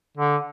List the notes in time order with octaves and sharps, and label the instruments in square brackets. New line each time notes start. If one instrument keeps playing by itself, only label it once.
[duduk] D3